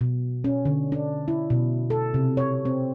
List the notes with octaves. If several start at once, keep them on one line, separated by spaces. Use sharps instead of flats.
B2
C#4
D3
D4
E4
B2
A4
C3
C#5
C4